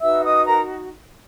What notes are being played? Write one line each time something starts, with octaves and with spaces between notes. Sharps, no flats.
D#4 F#4 B4 E5 E6
D#5 D#6
A#4 A#5